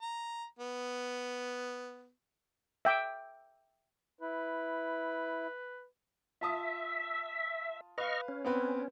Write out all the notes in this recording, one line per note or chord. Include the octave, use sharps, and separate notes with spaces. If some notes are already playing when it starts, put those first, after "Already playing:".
A#5
B3
E5 G5 D6
E4 B4
F4 E5 A5 D#6
B4 D#5 F5 C#6 F6
C#4
B3 C4 B4